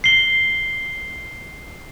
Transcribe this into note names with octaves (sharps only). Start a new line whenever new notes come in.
C7 G7